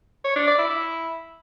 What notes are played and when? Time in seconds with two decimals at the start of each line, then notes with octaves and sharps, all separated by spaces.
0.25 C#5
0.36 D4
0.47 D5
0.58 E4
0.70 E4